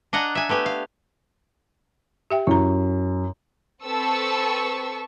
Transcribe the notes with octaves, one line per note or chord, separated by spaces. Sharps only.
D4 D#5 F#5 G#5 A#5
E5 G#5
A3 B3 G4 G#5
F5
G4 E5 G5
F#2 E4 A#5
C4 A4 B4 A5 C#6 E6